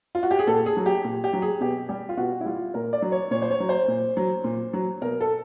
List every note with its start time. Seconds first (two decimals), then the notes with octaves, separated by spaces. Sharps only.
0.15 F4
0.23 F#4
0.31 G4
0.39 G#4
0.47 A#2 A4
0.66 G#4
0.77 F#3
0.86 G4
1.04 A#2
1.24 G4
1.33 F#3
1.42 G#4
1.60 B2 G4
1.89 G3 G4
2.09 F4
2.17 B2 F#4
2.41 E4
2.46 G3 F4
2.74 A#2 A#4
2.93 D5
3.02 F#3
3.12 C#5
3.31 A#2 C#5
3.42 C5
3.51 C#5
3.60 F#3
3.69 C5
3.88 A#2
4.17 F#3
4.44 A#2
4.73 F#3
5.01 B2 A#4
5.21 A4